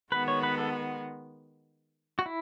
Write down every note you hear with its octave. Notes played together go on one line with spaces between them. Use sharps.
D#3 G#3 B3 F#4 B4
C#5
B4
A4
F#4
E4